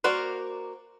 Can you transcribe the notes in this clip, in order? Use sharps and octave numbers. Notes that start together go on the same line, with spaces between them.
A#3 F#4 A#4 C5 D5